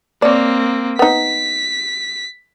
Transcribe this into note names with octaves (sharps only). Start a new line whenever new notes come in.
A#3 C4 C#5 D5
B3 D#4 B6